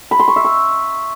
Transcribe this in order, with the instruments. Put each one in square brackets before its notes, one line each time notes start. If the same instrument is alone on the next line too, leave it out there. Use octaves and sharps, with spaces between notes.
[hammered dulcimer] B5
C6
C#6
E5
C#6